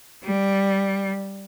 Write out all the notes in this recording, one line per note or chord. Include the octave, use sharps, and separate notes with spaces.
G3